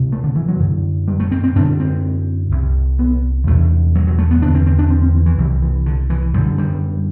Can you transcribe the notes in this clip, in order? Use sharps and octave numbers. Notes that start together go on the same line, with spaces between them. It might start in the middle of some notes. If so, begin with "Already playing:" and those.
Already playing: D2 C3
A3
D3
E3
F#3
F#2 D3
G3
A3
C4
C4
F#2 D3 D4
C4
C2 C3
B3
E2 C3 A3
F#3
F#3
A3
B3
E2 D3 D4
C4
C4
D4
C4
C4
E3
E3
C2 C3 F#3
E3
D3
E3
F#2 D3 G3
G3